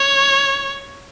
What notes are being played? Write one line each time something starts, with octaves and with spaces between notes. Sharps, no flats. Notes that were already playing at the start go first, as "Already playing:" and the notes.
Already playing: C#5